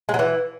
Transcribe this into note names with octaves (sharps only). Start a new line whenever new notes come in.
G#3
F#3
E3